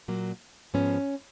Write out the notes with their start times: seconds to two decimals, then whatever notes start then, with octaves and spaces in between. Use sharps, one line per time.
0.08 A#2 F#3 A#3
0.74 G#2 F3 B3 C#4